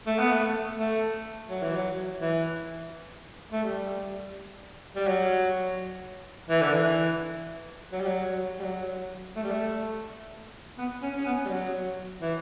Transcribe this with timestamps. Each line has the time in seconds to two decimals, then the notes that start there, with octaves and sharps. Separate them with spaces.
0.06 A3
0.19 B3
0.32 A3
0.78 A3
1.49 F#3
1.63 E3
1.76 F#3
2.21 E3
3.52 A3
3.64 G3
4.96 G3
5.07 F#3
6.49 E3
6.61 D3
6.73 E3
7.92 F#3
8.00 G3
8.07 F#3
8.60 G3
8.64 F#3
9.36 A3
9.43 G3
9.51 A3
10.78 B3
11.02 C#4
11.17 C#4
11.26 B3
11.46 G3
11.49 F#3
12.22 E3